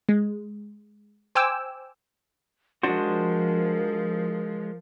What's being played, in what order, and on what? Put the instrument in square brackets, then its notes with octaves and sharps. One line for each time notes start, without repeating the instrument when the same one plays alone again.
[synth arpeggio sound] G#3
C5 G5 G#5 D6 E6
[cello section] F3 [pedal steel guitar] G#3 C5 [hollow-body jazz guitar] D4 F#4 [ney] A#4